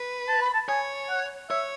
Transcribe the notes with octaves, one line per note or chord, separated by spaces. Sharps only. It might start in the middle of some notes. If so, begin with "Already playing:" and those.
Already playing: B4
A5
B5
A5
C#5 G#5
F#5
C#5 E5